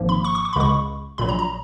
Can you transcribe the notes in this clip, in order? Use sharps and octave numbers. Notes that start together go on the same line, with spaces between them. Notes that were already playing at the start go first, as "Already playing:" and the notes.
Already playing: G#1 G#2 F3 A#3
B5
C#6
C#6
C#6
B5
C#2 C#3 G#3 C#6
A#1 A#2 F#3 B5
A#5
A#5